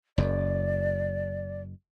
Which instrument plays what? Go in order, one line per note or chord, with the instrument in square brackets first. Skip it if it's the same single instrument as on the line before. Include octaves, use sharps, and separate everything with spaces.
[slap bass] F#1 F#2 [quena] D5